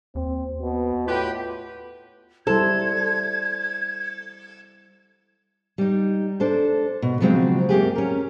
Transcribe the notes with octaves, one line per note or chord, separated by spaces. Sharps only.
D#2 C4
B2 B3
A2 F4 G4 B4
G3 E4 A4 C5 G#6
G3 D#4
D4 A4 C5
B2
C#3 F3 F#3 G#3 C4
F#2 A#3 G4 G#4
C#4 A#4